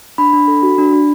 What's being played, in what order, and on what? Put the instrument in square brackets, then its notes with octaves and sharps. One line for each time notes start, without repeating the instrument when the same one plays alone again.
[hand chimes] D4 B5
D4
A4
F#4
D4
D4